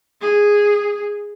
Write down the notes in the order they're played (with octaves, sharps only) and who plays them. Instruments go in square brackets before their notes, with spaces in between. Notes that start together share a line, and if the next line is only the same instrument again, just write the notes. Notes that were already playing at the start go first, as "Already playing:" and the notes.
[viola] G#4